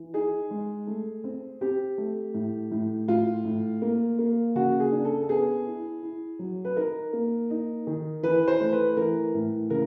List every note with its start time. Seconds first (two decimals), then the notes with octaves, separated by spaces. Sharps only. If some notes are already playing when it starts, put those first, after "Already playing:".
Already playing: E3
0.13 D#4 G#4
0.51 G#3
0.87 A3
1.24 C4
1.61 C4 G4
1.98 A3
2.34 A2
2.71 A2
3.08 A2 F4
3.45 A2
3.82 A#3
4.19 A#3
4.55 C#3 F#4
4.80 G#4
4.92 D4
5.05 A4
5.23 A4
5.29 B3 G#4
5.66 E4
6.02 E4
6.39 F#3
6.65 B4
6.76 D#4 A#4
7.13 A#3
7.50 D#4
7.87 D#3
8.23 E3 B4
8.48 C5
8.61 A3
8.72 B4
8.97 E3 A#4
9.34 A2
9.70 C#3 A#4